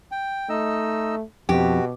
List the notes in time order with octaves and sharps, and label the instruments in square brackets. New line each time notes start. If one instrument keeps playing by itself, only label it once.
[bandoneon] G5
[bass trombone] A3 [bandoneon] D#4 D#5 E6
[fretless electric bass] F2 [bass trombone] B2 [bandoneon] F#4 [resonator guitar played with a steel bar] G4